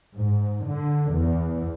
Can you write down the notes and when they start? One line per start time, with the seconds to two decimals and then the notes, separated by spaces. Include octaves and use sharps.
0.15 G#2
0.64 D3
1.12 E2